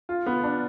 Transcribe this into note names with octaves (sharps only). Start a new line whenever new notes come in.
F4
B3
D4